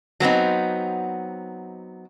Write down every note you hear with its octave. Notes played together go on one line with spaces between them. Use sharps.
F#3 B3 C4 D#4